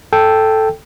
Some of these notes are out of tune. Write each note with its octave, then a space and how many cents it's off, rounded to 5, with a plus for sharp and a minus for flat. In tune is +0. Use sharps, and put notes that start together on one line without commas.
A4 +0 G5 +0